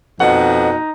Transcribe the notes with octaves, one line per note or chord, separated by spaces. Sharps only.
F2 B2 D#4 F#5